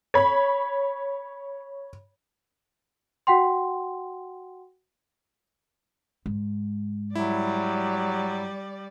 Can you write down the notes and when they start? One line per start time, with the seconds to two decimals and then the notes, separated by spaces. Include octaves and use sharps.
0.14 C#5 B5
3.27 F#4 F#5 G5 C6
6.26 G#2
7.15 F#3 G3 E4 D5